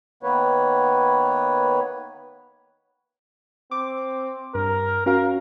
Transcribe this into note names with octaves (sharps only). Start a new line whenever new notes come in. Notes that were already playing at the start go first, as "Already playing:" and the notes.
D#3 A#3 B3 B4 C#5
C4 D6
G2 A#4
C#4 F#4 A#4 F5